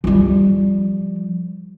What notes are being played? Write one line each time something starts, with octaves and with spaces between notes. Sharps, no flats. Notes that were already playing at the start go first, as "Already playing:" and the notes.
F3 G3